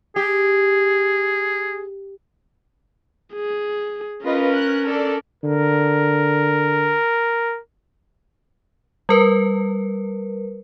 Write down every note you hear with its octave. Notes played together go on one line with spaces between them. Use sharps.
G4 G#4
G#4
C#4 F4 A#4 B4 D#5
F#6
D4 A4 D5
D3 A#4
G3 A#4 B4